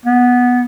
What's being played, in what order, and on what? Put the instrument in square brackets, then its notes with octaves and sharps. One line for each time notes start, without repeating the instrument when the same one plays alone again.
[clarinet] B3